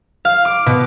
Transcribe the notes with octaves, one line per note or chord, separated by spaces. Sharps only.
F5
D6
B2